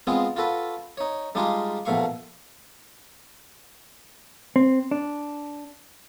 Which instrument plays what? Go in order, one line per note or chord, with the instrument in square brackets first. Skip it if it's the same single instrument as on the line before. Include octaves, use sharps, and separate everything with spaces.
[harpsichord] G#3 B3 C4 F4 G#4
F4 F#4 A4 B4
D#4 C#5
G3 G#3 D4 D#4 F4 G#4
A#1 B2 A3 F5 C#6
[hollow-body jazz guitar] C4
D4